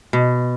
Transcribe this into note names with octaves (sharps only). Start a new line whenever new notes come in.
B2